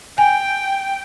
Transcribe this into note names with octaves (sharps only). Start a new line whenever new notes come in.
G5 G#5